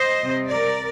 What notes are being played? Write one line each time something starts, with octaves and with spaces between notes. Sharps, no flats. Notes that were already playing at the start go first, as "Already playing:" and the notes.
Already playing: C5 D#5
C3 G3 C4
A#4 D5